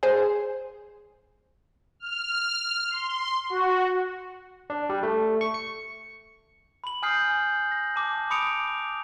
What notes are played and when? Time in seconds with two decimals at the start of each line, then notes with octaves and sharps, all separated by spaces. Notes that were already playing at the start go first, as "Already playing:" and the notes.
0.03 G#4 C5
2.00 F6
2.90 C6
3.50 F#4
4.70 D4
4.89 G3
5.03 A3
5.41 C#6
5.54 C#7
6.84 B5 F#7
7.03 G#5 D#6 F6 G6 C7
7.72 A#6
7.96 A5 D6
8.30 B5 D6 D#6 C#7 D7 F7
8.67 D6